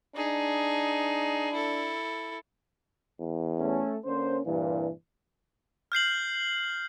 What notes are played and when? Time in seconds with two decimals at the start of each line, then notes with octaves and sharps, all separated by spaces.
0.15 D4 D#4 G#4
1.52 E4 A4
3.20 E2
3.60 A3 C#4
4.06 D3 A#3 C#4 C5
4.46 C2 G2 A#2 E3
5.92 F6 G6 C7 F#7